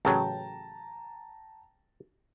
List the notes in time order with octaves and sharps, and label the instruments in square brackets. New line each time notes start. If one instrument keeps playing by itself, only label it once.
[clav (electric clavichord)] A1 C#3 F#3 [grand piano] G5 A5 A#5